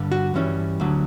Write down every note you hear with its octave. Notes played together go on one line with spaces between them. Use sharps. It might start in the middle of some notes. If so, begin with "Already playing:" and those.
Already playing: G2 D3 G3
F#4
G2 E3 G3 C#4 E4
D2 D3 F#3